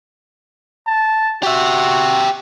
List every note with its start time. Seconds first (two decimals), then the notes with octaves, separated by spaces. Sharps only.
0.86 A5
1.43 F#4 G4 E5